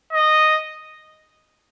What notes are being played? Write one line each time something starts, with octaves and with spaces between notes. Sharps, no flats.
D#5